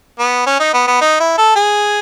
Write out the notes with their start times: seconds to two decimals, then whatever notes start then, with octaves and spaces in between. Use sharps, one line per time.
0.19 B3
0.47 C#4
0.60 D#4
0.74 B3
0.87 B3
1.01 D#4
1.20 E4
1.38 A4
1.56 G#4